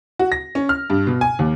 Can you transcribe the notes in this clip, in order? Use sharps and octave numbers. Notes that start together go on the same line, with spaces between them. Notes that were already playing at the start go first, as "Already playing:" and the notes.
F#4
A#6
C#4
F6
G2
B2
G#5
D#2